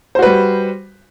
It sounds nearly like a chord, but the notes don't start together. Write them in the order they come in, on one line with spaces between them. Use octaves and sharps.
C5 F#4 B4 G3